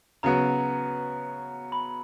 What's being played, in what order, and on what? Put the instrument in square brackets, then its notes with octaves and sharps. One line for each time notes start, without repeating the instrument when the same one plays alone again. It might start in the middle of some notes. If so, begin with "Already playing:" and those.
[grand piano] C#3 F#3 B3 F#4 [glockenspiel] A#5
[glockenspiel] B5